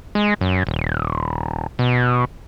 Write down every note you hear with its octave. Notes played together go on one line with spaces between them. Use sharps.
G#3
F#2
D#1
B2